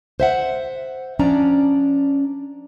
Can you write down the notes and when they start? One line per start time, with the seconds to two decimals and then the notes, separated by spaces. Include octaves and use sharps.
0.20 C5 E5 F#5
1.19 F3 C#4 D4 D5 A#5